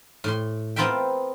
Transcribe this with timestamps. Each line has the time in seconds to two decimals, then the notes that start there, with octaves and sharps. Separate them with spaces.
0.24 A2 C6
0.76 B3 C4 F4 A#4 E5 G5